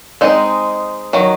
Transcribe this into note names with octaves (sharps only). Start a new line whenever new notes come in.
G#3 C4 D#4
D#3 F#3